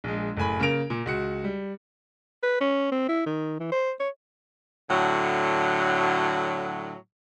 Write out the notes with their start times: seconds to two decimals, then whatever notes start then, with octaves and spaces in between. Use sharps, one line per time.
0.04 A#1 G#3
0.37 F#1 A2 G#5 B5
0.60 C#3 A#3 A#4 A#6 D7 F7
0.90 A#2
1.06 C#2 F#4 C#7
1.44 G3
2.43 B4
2.60 C#4
2.92 C4
3.08 E4
3.26 D#3
3.60 E3
3.72 C5
4.00 C#5
4.90 A2 D3 F#3